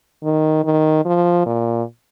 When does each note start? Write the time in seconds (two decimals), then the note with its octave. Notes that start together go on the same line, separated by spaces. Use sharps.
0.24 D#3
0.65 D#3
1.05 F3
1.46 A#2